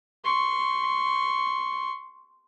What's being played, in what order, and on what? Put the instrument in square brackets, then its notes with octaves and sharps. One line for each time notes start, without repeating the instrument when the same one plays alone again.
[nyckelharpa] C6 C#6